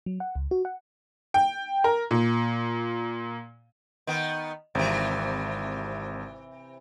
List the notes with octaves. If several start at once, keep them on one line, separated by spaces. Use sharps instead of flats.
F#3
F#5
C#2
F#4
F#5
G5
A#4
A#2
D#3 B3
G#1 C3 E3